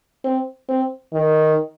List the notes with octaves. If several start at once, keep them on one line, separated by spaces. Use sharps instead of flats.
C4
C4
D#3